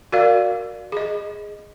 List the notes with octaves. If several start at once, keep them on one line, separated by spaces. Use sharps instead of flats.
F#4 A#4 D5 F5
G#4 D#5